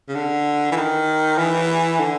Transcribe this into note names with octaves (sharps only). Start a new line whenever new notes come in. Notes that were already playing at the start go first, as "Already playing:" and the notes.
C#3
D3
E3
D#3
E3
D3